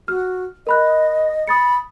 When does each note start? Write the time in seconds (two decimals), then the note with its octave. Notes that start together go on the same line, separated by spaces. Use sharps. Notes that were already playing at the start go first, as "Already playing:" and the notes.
0.08 F#4 F6
0.67 A#4 D#5 B5 F#6
1.48 B5 D#6 A6 C#7